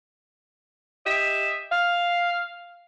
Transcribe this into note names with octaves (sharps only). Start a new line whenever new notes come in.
G4 D#5 E5
F5